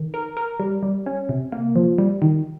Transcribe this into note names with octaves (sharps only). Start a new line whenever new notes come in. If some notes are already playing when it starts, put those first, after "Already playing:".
Already playing: D#3
A#4
A#4
G3
G3
C#4
C3
A#3
F3
G3
D#3